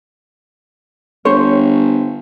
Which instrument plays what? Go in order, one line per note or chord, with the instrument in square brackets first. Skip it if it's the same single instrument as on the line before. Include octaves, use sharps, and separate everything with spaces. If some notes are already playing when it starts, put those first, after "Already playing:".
[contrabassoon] G1 [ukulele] C5 C#5